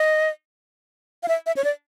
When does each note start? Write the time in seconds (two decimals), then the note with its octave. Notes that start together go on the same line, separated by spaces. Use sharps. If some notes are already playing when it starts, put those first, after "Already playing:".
Already playing: D#5
1.23 F5
1.28 E5
1.46 E5
1.56 C#5
1.64 D5